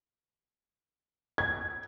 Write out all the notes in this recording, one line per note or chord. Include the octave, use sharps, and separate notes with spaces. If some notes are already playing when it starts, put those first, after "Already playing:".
G#6